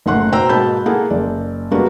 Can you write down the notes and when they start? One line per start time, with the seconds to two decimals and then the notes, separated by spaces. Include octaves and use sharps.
0.06 F#1 A2 D#4 F#5 C6 F#6
0.32 B2 C5 G5 A#5 E6
0.49 G#2 B2 A#3 A5 B5 G6
0.86 A#3 E4 G#4 A4 F#5
1.10 F#1 D5
1.71 G3 G#3 A#3 B3 D4 F#4